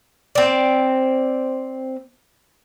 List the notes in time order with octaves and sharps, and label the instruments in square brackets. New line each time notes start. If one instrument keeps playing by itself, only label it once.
[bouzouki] C4 D5